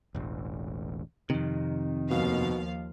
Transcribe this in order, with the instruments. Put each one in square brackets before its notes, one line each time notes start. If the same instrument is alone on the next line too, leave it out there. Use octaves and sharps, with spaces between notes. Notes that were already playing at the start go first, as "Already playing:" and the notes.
[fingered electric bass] E1 A1
[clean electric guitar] F2 C3 [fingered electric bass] D#3
[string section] D#2 F3 F5 [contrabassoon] B2